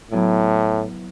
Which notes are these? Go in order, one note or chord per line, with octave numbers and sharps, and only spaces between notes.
A2 F#3 B3 E4